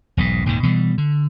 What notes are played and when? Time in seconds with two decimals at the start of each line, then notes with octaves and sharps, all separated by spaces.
0.17 E1 B1 G#2
0.46 D#1 D#2 G#2 D#3
0.63 B2 E3 F3 G3
0.98 D3